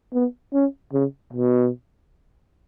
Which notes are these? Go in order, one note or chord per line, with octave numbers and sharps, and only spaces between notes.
B3
C#4
C#3
B2